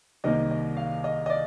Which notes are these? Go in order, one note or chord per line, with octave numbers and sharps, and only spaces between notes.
C2 C3 D#3 A#3 D#4 D#5
D#5
F5
D#5
D#5
D5